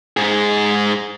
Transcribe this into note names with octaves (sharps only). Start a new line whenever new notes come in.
G#2 G#4